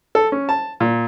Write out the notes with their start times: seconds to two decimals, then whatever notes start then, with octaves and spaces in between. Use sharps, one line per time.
0.15 A4
0.32 C#4
0.49 A5
0.80 A#2